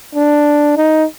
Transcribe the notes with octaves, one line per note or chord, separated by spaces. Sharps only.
D4
D#4